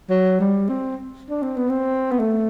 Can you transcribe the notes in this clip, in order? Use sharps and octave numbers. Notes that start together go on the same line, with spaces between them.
F#3
G3
C4
D4
C4
B3
C4
B3
A3